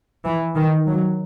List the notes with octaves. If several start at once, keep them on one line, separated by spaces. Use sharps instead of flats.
E3
D#3
F#3